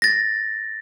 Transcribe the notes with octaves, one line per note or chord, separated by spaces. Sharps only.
A6 A#6